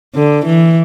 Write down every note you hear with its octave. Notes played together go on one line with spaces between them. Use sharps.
D3
E3